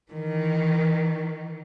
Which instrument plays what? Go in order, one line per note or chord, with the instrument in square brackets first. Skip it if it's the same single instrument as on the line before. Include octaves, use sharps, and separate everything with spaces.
[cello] D#3 E3